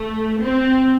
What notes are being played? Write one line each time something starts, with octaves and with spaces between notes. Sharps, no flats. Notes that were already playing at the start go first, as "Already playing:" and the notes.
Already playing: A3
C4